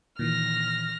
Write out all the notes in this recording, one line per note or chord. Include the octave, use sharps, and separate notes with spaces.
A#2 D#3 E3 F6 A#6